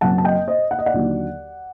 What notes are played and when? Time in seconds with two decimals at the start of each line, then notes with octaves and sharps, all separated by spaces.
0.01 F#1 F#2 F#3 C4 F#5 A5
0.18 A5
0.24 D#5 G5
0.48 C5 D#5
0.71 F#5
0.79 D#5
0.86 D5 F#5
0.94 D#2 D3 F#3